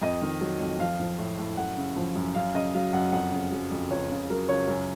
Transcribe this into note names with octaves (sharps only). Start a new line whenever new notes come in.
F2 D#5
D#3
F#3
F2
F3 F5
F3
A2
A2
F#2 F#5
C#3
F3
F#2
F#2 F5
C#3 D#5
F#3 F5
F#2 F#5
F2 F#5
C#3
F#3
F2
C#2 C#5
C#3
F#3 A#4
C#2 C#5
F#2